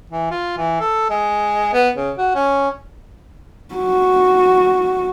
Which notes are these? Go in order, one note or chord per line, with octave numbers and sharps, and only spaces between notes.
E3
F4
E3
A4
G#3
B3
C#3
F#4
C#4
F#4